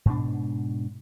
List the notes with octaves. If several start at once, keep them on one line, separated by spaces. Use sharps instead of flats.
G#2 B2 D4